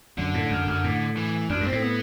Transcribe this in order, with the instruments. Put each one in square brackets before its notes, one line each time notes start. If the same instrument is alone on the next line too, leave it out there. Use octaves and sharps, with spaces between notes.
[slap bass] F#2 [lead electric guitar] D3
[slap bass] A2
F#2
F#2
A2
[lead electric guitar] E3
[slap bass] F#2 [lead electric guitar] D4
[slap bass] G2
[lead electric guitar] C4
[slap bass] A2
[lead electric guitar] B3